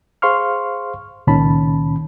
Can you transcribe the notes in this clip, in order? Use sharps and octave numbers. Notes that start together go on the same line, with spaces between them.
G#4 C5 F5 C6 C#6 F6
C#2 A#2 D#3 C#4 A5 B5